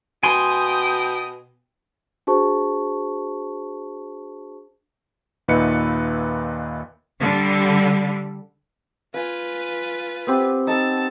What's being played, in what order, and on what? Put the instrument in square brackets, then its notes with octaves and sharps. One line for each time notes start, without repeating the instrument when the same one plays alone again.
[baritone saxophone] B2 [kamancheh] G5 D#6 [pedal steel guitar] G#5 C6
[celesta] D4 F#4 G#4 C5 A5 C#6
[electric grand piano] D#2 A#2 D#4 B4 E5 C#7
[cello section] D3 G3
[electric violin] F4 B4 [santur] G#5
[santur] B3 C4 G4
[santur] D#4 A4 [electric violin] A5